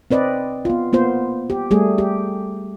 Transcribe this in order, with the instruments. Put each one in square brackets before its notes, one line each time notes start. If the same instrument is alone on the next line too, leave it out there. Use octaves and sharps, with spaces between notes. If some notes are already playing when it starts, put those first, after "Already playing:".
[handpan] C4 B4 D5 D#5
B3 F4
A#3 B3 F4 C5
G4
G3 A3 G#4
G4